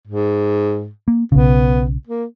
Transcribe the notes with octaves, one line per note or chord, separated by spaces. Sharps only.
G#2
A#3
B1 C#3 B3
A#3